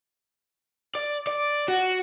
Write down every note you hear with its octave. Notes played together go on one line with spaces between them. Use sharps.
D5
D5
F#4